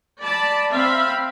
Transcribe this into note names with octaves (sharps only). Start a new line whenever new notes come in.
D5 A5 B5
C4 E5 F5 B5